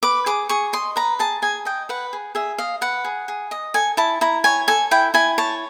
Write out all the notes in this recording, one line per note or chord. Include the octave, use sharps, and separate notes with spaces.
B4 D6
G#4 D6
G#4 C#6
D#5 C6
B4 A#5
G#4 A5
G#4 G#5
D#5 G5
B4 F#5
G#4
G#4 E5
D#5 F5
B4 F#5
G#4
G#4
D#5
A4 G#5
E4 A5
E4 A#5
C#5 G#5
A4 G#5
E4 G5
E4 G#5
C#5 A5